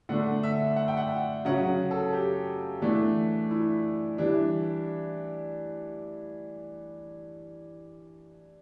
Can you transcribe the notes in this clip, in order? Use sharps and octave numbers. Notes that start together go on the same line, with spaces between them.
D3 A3 D4 F#5
E5
F#5
G5
F#5
C#3 F#3 C#4 F#5
A4
G4
E3 A3 D4
E4
E3 G3 D4